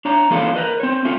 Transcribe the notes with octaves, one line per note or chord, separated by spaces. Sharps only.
D4 C#5 A#5
E3 A#3 C#4 F4 G#4 A4
A#4 B4 D#5
C4 C#5
A3 C#4 F4